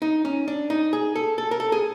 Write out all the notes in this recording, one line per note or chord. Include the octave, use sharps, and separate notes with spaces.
D#4
C#4
D4
D#4
G#4
A4
A4
A#4
A4
G#4